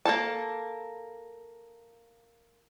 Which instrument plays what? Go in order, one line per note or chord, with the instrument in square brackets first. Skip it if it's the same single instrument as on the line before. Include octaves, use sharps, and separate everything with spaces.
[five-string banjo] A#3 F4 A4 A5